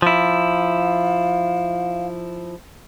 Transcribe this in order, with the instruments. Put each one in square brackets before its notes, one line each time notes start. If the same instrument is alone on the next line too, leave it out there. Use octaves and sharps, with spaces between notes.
[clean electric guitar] F3 E4 [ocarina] F5